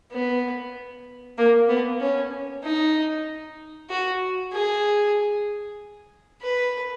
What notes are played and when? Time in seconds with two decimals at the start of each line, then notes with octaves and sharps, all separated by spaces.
0.12 B3
1.38 A#3
1.69 B3
2.00 C#4
2.64 D#4
3.89 F#4
4.52 G#4
6.41 B4